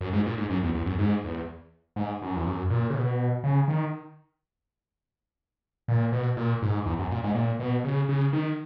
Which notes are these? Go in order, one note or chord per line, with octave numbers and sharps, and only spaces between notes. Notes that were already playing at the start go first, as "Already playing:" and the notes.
F#2
G#2
A#2
G#2
F#2
E2
E2
F#2
G#2
E2
G#2
F#2
E2
F#2
A#2
C#3
B2
C#3
D#3
A#2
B2
A#2
G#2
E2
F#2
A#2
G#2
A#2
B2
C#3
C#3
D#3